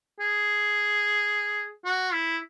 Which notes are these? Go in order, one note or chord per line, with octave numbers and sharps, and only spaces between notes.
G#4
F#4
E4